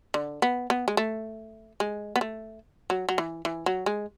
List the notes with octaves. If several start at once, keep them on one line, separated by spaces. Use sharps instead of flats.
D3
B3
B3
G#3
A3
G#3
B3
A3
F#3
F#3
E3
E3
F#3
G#3